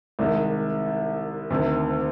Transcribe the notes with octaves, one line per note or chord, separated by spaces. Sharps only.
C2 C3 D#3 G#3
D2 C3 D#3